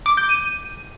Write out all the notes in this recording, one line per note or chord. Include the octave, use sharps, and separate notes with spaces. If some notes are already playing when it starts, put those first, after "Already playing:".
D6
G6
D#7